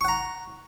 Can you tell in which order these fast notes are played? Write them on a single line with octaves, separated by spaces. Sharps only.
C#6 F#5 A#5